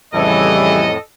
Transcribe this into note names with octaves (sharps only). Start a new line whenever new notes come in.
F2 A2 C#3 E3 G3 A4 D#5